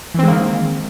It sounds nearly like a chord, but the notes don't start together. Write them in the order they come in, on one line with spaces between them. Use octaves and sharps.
E3 C4 G#3 A#3 D#3